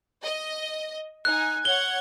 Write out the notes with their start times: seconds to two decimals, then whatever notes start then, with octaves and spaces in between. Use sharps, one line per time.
0.24 D#5
1.25 D#4 G#5 F#6
1.65 C#5 F#5 G#6 G7